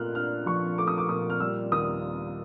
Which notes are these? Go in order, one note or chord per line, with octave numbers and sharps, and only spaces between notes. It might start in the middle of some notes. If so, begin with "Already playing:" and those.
Already playing: A#2 A3 F6 F#6
D4 F6
F3 C#6
A3 D6
D#6
D6
A#2 D#6
F6
G3 E6
D#2 D#6